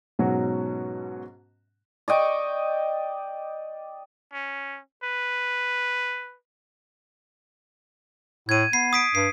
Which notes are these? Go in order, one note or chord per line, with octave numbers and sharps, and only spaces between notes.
G#2 B2 F#3 C#4 F#4
D5 D#5 G5 C#6
C#4
B4
A2 G#6 D#7
B3 C7
D#6 B6 D7
G2 C7